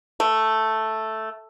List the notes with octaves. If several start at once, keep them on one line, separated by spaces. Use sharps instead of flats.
A3